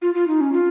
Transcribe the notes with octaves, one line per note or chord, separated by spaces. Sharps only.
F4
F4
D#4
C#4
F4